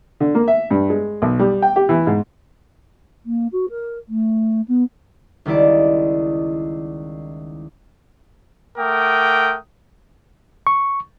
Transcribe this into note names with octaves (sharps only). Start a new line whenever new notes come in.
D3
A#3
E5
G2
G#3
B1
G3
G5
G4
E3
G#2
A#3
F#4
A#4
A3
B3
C#2 D#3 G3 E4 D5
A3 A#4 F#5 G5 D6 D#6
C#6